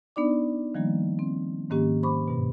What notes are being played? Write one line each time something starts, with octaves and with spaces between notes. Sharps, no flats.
B3 D4 D#4 D5 D6
D#3 F3 G3 A#3
C4
G#2 D#3 A#3 C#4 G4
C5 B5 C#6 D6
G2 B2